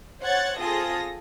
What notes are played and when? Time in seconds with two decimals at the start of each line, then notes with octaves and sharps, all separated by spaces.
0.21 C5 C#5 F#5 F#6 G#6 A6
0.56 C4 F4 G#4 A4 D#6 A#6